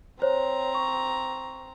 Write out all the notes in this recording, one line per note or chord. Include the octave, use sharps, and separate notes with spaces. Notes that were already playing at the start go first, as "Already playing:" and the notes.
C4 C5 C#5 A#5
C#6